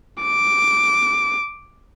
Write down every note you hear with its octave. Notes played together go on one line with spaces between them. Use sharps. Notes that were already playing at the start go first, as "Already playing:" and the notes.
D6